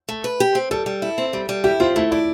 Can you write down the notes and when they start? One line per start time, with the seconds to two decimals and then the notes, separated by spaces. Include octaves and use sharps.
0.09 A3
0.24 B4
0.40 G4
0.55 C4
0.71 G3 A4
0.86 G3
1.02 E4
1.18 C4
1.33 G3
1.49 G3
1.64 E4 G4
1.80 C4 F4
1.96 A3 E4
2.11 E4 D5